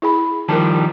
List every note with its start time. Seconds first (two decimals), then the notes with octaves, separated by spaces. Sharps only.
0.02 E4 G#4 B5
0.49 D#3 F3 G3 A#4 A5